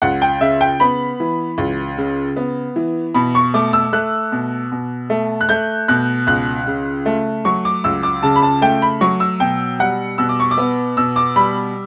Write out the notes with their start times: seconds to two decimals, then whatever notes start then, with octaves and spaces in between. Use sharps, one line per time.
0.02 C#2 F#5
0.22 G5
0.41 C#3 E5
0.61 G5
0.80 B3 B5
1.20 E3
1.58 C#2
1.97 C#3
2.36 B3
2.76 E3
3.14 B2 B5
3.35 C#6
3.54 A3 D6
3.73 E6
3.93 A3 F#6
4.32 B2
4.72 B2
5.10 A3
5.41 F#6
5.49 A3 G6
5.88 B2 F#6
6.27 C#2 F#6
6.67 C#3
7.06 A3
7.45 F#3 C#6
7.65 D6
7.84 C#2 E6
8.03 D6
8.23 C#3 A5
8.36 B5
8.42 A5
8.62 A3 G5
8.82 B5
9.01 F#3 C#6
9.20 E6
9.40 B2 G5
9.79 G3 F#5
10.18 B2 E6
10.29 D6
10.40 C#6
10.51 D6
10.58 B3
10.97 B2 E6
11.16 D6
11.36 G3 B5